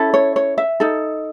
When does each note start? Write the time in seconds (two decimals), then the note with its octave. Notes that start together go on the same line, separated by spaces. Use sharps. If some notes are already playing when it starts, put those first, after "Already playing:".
Already playing: C#4 E4 A4
0.14 C#5
0.36 C#5
0.58 E5
0.80 D#4 A4